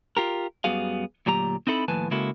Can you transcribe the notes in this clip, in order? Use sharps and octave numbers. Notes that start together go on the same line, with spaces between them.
F4 G4 A#4
F#2 G3 B3 F#4 G#4 F5
D2 A#2 F#3 G4 A#5
C4 D#4 E4 A4 B5
D#2 A2 F3 B4 G#5 A5
C#3 G#3 A#3 E4 F#4 A4